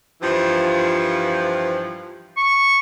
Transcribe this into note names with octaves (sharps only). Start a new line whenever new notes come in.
G2 E3 F3
C#6